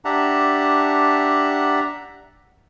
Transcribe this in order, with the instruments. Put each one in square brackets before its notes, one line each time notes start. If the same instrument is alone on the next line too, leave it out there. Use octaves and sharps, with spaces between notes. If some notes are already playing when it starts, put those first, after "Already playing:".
[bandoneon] D4 G4 E5 F#5 A5 A#5